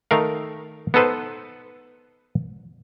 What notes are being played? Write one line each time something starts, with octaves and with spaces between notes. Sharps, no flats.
D#3 A3 A#4 F5
B3 D#4 A4 B4 C5